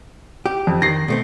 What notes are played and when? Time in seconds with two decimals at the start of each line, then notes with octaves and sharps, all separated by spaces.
0.46 G4
0.67 F2
0.82 D#3 A#6 C7
1.08 B2 A3 C4